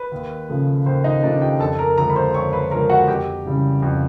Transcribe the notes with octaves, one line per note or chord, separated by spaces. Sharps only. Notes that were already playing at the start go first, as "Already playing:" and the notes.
Already playing: B4
D#2
C#3 F3 A3
D#2 C5
D#4 D#5
C#3 F3 A3 D4 D5
G4 G5
F2 A4 A5
A#4 A#5
D3 F3 G#3 A#4 A#5
B5
C5 C6
F2 C#5 C#6
B4 B5
D3 F3 G#3 A#4 A#5
F#4 F#5
F2 G4 G5
C#3 E3 G3
F2